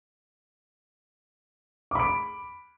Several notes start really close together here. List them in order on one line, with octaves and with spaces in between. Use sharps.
D6 B5 D7